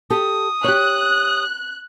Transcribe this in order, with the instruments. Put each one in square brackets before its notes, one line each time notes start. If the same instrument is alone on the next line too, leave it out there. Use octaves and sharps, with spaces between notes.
[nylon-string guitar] G4 A4 [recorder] D#6
[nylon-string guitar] G4 C#5 [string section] F#6